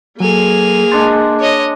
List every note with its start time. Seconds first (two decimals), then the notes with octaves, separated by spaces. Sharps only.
0.20 F#3 A#3 G#4 A4 G#5 F7
0.92 G#3 D4 F#5 C6 A6
1.40 C#5 D#5